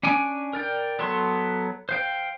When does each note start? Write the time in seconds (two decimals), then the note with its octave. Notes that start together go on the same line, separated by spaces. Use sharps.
0.03 C#4 D4 G#5 D6
0.53 A#4 D5 G5
0.99 F#3 B3 A4 C#5 C6
1.89 C5 F5 G5